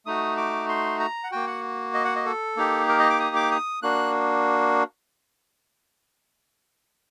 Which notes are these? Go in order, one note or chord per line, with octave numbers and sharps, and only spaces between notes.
A3 D#4 F#4 D#6
D6
C6
A#5
F#5
A#3 F#4 G5
F#5
D#5
F#5
D#5
A4
A#3 D#4 G4
A#4
D#5
D6
D#6
D6
D#6
A#3 D4 F#4 F#6